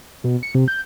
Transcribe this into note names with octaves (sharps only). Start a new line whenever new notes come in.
B2
C#7
C3
G6